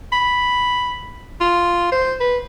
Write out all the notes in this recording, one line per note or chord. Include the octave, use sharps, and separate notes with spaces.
B5
F4
C5
B4